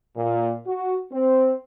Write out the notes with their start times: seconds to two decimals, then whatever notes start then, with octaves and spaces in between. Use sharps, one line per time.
0.17 A#2
0.67 F#4
1.13 C4